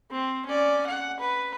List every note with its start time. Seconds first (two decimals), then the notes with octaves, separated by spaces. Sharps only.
0.11 C4
0.46 C#4 D5
0.86 F#5
1.20 B4